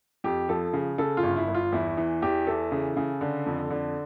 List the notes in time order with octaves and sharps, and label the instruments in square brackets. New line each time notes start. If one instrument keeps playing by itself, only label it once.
[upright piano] F2 G4
F3 A4
C#3
C#3 A4
F4
G1
E4
G1
F4
E2 E4
E3
E2 G4
E3 A4
C#3
C#3
D3
F2
D3